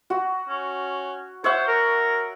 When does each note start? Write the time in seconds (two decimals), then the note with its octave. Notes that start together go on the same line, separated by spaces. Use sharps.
0.10 F#4
0.49 C#4
1.44 C5 C#5 E5 F#5
1.68 A#4